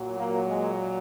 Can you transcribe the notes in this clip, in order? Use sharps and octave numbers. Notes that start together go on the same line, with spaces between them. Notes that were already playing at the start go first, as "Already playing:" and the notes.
Already playing: A#2 F#3
A#3
G#3